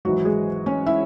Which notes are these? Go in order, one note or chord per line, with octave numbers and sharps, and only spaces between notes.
G#1 G#2 E3 F#3 F#4
G#3 G#4
C#4 C#5
E4 E5